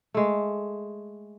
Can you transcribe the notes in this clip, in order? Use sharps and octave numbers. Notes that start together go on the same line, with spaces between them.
G#3 A3